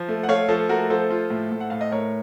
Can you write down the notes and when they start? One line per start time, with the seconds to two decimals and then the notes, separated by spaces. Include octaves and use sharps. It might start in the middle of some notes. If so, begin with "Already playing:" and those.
Already playing: F3
0.08 A3
0.23 F#5
0.28 A3 C#5 F5
0.49 F3 A4
0.69 A3 F#4 A#4
0.90 F3 A4 C5
1.11 F4
1.30 A2
1.52 A2
1.60 F#5
1.70 A2 F5
1.81 D#5
1.92 A2 A#4 C#5